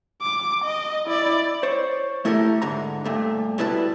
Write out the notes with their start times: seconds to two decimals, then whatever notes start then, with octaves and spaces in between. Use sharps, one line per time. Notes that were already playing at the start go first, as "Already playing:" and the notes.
0.22 D6
0.64 D#5
1.07 E4 D5
1.63 C5 C#5
2.25 A3 E4 G4 A4 A#4
2.62 G#2 D3 A#5
3.05 G2 A#2 A3
3.58 B2 G3 E4 B4 A5